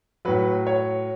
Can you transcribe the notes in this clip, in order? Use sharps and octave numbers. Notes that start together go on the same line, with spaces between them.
A2 F#3 B4
C#5